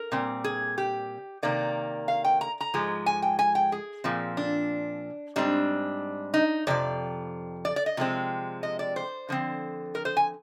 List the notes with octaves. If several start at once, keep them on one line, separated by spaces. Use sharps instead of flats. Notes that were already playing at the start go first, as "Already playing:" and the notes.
Already playing: A#4
A#2 G3 C4
G#4
G4
C3 D#3 A#3 D5
F5
G5
A#5
A#5
G#2 F3 G#3
G#5
G5
G#5
G5
G#4
A#2 F3 C4
D4
G#2 G3 C4 D4
D#4
F2 C3 F3 D5
D5
D5
D#5
C3 F3 G#3 C4
D#5
D5
C5
D3 F3 C4
A#4
C5
G#5